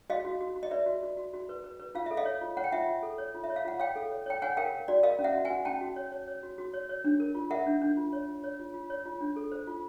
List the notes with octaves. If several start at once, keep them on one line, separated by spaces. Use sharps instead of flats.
F#4 D#5 F5
F#4
F#4
F#4
D#5
B4 D5 E5
F#4
F#4
F#4
F#4
B4
B4
B4
F4 F5
A4 E5
D#5 F5
C#5
F4
C#5 F#5
G5
F4 E5 F#5
F4
A4
C#5
F4
E5
C#5
F5
F4 F#5
C#5 F5 G5
A4
C#5
C#5 G5
C#5 F#5 G#5
A#4 F5 G5
A#4
F#4 D5
A#4 D#5 F5
C#4
E5 F#5
F#4
F#5 G#5
F#4
C#4 G5 A5
F#4
C#5
C#5
C#5
F#4
F#4
C#5
C#5
D4
A#4
F4
A#4 E5 F#5
D4
D4
F4
C#5
F4
C#5
F4
F4
C#5
F4
D4
A4
C5
F4